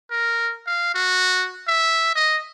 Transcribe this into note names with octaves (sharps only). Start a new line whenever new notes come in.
A#4
F5
F#4
E5
D#5